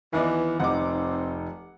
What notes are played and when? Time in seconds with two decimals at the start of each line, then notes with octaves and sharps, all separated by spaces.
0.13 D#2 E3 B3 D5 D#5 G#5
0.60 F1 C4 D#4 F#5 D6